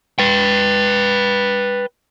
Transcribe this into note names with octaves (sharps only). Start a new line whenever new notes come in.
B4 G5